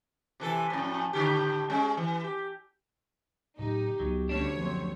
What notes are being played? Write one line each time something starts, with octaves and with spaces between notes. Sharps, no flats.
C3 E3 A4
F2 A2
A2 D3 G4
G#3 C#4
E3
G4
A2 C#3 F#3 D#4 G4
C#2 F#3 B3
D2 G3 C#4 D4 C#5
F#2 F3 C4